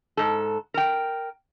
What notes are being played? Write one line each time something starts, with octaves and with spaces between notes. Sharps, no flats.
G#2 A4
A#4 G5